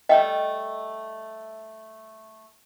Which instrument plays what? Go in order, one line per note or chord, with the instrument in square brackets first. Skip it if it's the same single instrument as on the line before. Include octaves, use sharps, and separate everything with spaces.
[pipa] G3 A3 E5 [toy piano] D#5 G5